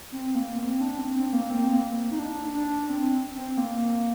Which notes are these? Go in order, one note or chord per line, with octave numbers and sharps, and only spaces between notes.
C4
A#3
C4
D4
C4
C4
A#3
C4
A#3
D#4
D4
D4
C4
C4
A#3